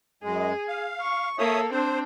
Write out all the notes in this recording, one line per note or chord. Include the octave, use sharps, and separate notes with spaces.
F#2 G#3 G#4
F5
C#6
A#3 A4 C#5 E5 D#6
C4 D4 C5